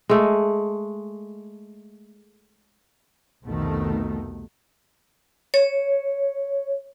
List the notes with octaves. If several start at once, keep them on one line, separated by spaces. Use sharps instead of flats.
G#3 A3
C2 F2 B2 D#3 A3
C#5